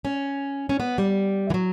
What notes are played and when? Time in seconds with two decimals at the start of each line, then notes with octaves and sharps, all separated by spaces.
0.05 C#4
0.69 C#4
0.80 B3
0.98 G3
1.50 E3
1.54 F#3